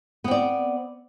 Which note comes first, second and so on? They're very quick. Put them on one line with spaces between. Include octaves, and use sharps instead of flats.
B3 C4 D5